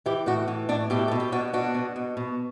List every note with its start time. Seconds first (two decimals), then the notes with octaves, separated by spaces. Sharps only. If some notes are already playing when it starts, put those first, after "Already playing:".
0.06 E3 E4 G4
0.26 A2 D4 F#4
0.48 E3
0.69 A2 D4 F#4
0.90 B2 E4 G4
1.08 B2 A4
1.20 G4
1.32 B2 D4 F#4
1.53 B2 D4 F#4
1.75 B2
1.96 B2
2.17 B2